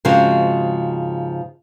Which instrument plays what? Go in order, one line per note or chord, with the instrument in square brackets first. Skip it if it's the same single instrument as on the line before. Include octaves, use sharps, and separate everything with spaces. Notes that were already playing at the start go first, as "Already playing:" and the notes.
[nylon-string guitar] G#2 C#3 F3 G#3 C4 F#4